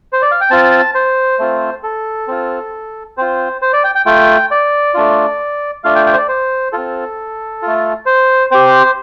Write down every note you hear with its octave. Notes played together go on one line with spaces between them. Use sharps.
C5
D5
F5
G5
C4 F4 A5
C5
A3 C4 F4
A4
C4 F4
C4 F4 C5
C5
D5
G5
G5
A3 F4 G5
D5
A3 D4 F4
A3 D4 F4 F5
G5
G5
C5
D5
C5
C4 F4 A4
A3 F4
C5
C4 G4 C5